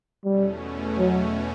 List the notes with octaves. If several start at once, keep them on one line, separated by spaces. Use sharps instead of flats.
E2 B2 G3 A3 C#4
F#3